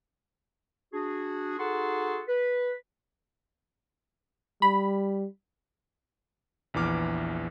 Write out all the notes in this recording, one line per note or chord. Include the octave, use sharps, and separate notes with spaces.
D4 F#4 G#4
D#4 F#4 G#4 A4 F#5 C6
B4
G3 B5
A#1 E2 E3 D6 F6